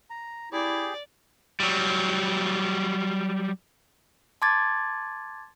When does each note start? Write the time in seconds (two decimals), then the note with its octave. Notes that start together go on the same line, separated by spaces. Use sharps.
0.10 A#5
0.52 E4 G4 G#4 D5
1.60 F#3 G3
4.42 A5 C6 D6 G#6 A6